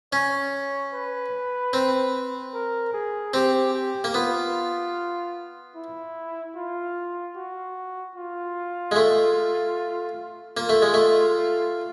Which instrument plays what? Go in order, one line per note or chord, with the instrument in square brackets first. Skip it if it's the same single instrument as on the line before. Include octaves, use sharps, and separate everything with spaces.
[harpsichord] C#4 [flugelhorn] C#5
[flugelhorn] B4
[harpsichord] C4
[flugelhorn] A#4
G#4
[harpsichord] C4 [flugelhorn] G4
[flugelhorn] G4
[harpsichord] A#3
[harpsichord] B3 [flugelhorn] F4
[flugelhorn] E4
F4
F#4
F4
[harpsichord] G#3
A3
[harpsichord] A#3 [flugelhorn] F4
[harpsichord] A3
G#3
A3